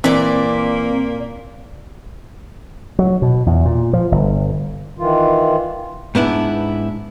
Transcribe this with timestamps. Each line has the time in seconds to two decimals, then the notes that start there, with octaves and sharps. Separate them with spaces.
0.04 A#2 E3 A#3 C4 D5 B6
2.99 F#3
3.22 B2
3.46 E2
3.65 A#2
3.93 F3
4.12 G1
4.99 D#3 E3 F4
6.15 G#2 B3 D4 E4